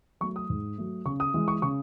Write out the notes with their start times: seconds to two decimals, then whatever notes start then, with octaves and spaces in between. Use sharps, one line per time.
0.21 F#3 A3 C#6
0.36 D#6
0.50 G#2
0.78 F#3 A3
1.05 C#3 C#6
1.20 D#6
1.34 E3 G#3
1.48 C#6
1.62 C#3 C#6